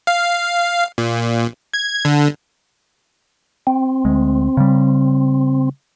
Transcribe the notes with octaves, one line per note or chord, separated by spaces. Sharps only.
F5
A#2
G#6
D3
C4
D2 G#3
C#3 G3